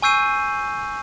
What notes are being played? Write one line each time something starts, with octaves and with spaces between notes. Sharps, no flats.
G#5 C#6 E6 G6 C7 D#7